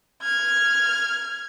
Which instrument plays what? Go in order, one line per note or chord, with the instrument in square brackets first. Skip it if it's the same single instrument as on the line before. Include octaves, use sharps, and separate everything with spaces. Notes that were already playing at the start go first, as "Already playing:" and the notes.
[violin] F6 G#6